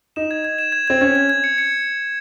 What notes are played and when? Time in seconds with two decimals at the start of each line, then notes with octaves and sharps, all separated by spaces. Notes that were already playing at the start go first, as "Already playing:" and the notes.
0.16 D#4 E7
0.31 G#6
0.45 G#6
0.58 E7
0.72 G#6
0.88 C4 G#6
1.01 C#4 G#6
1.15 G#6
1.29 G#6
1.44 C#7
1.58 C#7